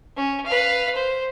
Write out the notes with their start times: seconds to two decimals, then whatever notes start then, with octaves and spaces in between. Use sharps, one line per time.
0.16 C#4
0.46 B4 F5
0.95 C5